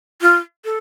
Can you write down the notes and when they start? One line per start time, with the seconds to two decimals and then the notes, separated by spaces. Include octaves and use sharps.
0.21 F4
0.65 A4